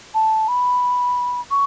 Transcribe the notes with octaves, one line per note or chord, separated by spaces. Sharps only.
A5
B5
C#6